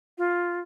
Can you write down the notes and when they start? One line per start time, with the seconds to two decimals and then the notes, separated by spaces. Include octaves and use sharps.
0.18 F4